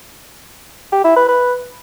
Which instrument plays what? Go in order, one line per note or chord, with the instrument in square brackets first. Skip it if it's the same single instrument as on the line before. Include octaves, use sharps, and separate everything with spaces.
[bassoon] G4
E4
B4
B4